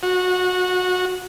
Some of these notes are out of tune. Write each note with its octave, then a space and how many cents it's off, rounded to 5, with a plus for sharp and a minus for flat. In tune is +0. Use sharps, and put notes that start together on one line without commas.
F#4 -20